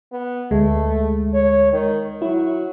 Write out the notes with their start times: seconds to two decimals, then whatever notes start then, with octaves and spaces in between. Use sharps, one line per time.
0.12 B3
0.51 D2 G#3 A3
1.34 C#5
1.73 D#3
2.22 F#3 E4